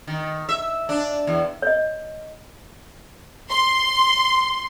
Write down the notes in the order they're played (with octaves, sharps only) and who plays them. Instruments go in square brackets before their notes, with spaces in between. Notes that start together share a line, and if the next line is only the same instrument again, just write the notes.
[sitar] D#3
E5
D4
E2
[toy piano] C#5 D#5
[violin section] C6